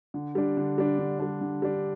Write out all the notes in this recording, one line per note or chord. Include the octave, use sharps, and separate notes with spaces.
D3
G3 D4
D3
G3 D4
D3
G3 D4
D3
G3 D4